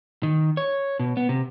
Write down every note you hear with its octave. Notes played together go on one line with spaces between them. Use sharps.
D#3
C#5
B2
B3
C3